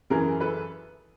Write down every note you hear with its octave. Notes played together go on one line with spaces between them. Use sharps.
F#2 C#3 E3 G#4 A#4
A4 B4